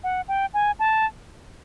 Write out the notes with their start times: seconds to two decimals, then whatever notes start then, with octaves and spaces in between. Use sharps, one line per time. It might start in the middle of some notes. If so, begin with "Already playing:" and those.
0.04 F#5
0.28 G5
0.54 G#5
0.79 A5